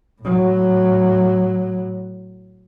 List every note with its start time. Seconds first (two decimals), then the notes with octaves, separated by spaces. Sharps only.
0.22 A2 F#3